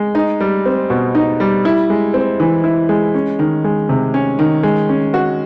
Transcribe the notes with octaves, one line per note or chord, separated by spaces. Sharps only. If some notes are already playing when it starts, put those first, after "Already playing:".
Already playing: G#3
D#4
G3
C4
B2
D#4
G3
E4
G#3
C4
E3
E4
G#3
C#4
D#3
G#3
C3
C#4
D#3
G#3
C#4
F#4